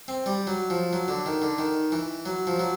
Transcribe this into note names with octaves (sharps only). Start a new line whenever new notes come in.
C4
G3
F#3
F3
F#3
D3
D#3
D3
D#3
E3
F#3
F3
F#3